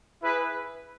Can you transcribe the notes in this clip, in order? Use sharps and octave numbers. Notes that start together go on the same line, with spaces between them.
E4 G#4 B4